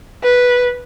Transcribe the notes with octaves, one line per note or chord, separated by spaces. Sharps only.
B4